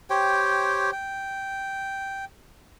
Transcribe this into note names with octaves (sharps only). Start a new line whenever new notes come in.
G4 C5 C#5 G5
G5